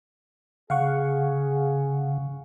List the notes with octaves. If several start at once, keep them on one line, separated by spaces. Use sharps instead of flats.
C#3 G#4 F5 F#5 C#6